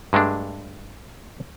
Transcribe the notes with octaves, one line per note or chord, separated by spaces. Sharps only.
G2 G#3 A3 D4